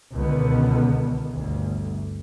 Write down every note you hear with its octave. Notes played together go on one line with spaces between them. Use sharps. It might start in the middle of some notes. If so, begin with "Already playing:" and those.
C#2 B2 D3 D#3 B3
G1 D2